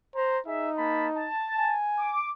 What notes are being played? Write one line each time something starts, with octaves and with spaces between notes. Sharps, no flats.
C5 A#5
D#4 G#4 E5
A#3 A5 B5
A5
G#5
D6